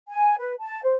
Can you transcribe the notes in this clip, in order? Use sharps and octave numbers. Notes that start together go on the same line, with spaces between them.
G#5
B4
A5
C5